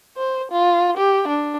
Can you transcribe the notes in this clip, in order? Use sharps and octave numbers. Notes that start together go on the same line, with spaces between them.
C5
F4
G4
D4